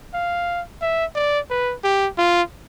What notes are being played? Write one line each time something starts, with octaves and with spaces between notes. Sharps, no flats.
F5
E5
D5
B4
G4
F4